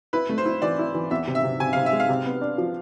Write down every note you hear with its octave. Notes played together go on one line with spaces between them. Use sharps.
E4 B4
A3
C5
E4
E3 D5
E4
E3
E2 E5
C3
E5
C3
C3 G#5
C3 F5
E5
G#3
F5
C3
B3
D4
F3